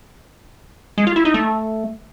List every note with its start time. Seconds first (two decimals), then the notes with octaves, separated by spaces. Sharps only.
0.98 G#3
1.07 F4
1.16 E4
1.25 D#4
1.34 A3